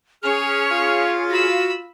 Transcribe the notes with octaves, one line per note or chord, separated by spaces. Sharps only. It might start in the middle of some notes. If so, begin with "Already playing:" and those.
C#4 G#4 C#5 F6
F4
F#4 B5 E6